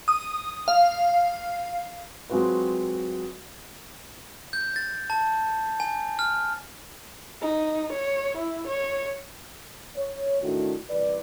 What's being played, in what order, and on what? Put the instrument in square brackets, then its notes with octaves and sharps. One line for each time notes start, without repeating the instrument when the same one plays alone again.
[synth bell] D#6
F5
[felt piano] F#3 G#3 C4 F4 F#4 B4
[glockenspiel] G6
A6
A5
G#5
F6
[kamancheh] D#4
C#5
E4
C#5
[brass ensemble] C#5
A2 D#3 A3 D4 E4 F#4
C2 E3 B4 D5